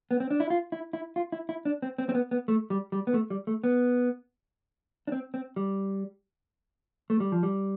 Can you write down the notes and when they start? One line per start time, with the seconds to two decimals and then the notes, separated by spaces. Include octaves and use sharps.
0.11 B3
0.20 C4
0.30 D4
0.40 E4
0.50 F4
0.72 E4
0.93 E4
1.16 F4
1.32 E4
1.49 E4
1.65 D4
1.82 C4
1.98 C4
2.09 C4
2.15 B3
2.31 B3
2.48 A3
2.70 G3
2.92 G3
3.07 B3
3.14 A3
3.30 G3
3.47 A3
3.64 B3
5.07 D4
5.12 C4
5.34 C4
5.56 G3
7.10 A3
7.20 G3
7.32 F3
7.43 G3